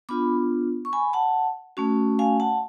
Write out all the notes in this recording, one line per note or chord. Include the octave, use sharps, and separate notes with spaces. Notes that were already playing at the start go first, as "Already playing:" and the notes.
B3 D4 F4 B5 D6
C#6
G#5 B5
F#5 A5
A3 C#4 F#4
F5 G#5
F#5 A5